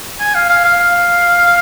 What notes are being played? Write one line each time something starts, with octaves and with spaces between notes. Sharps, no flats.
G#5
F5
F5
F5